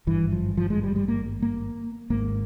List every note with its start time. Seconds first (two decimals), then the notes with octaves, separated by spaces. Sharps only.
0.06 G#1 G2 E3
0.32 F3
0.57 F3
0.70 G#3
0.83 G3
0.96 G3
1.08 A#3
1.42 A#3
2.10 G#1 G#2 A#3